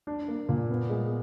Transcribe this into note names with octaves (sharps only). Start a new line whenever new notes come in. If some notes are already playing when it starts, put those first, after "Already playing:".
D4
A#3
A#2
B3
G#3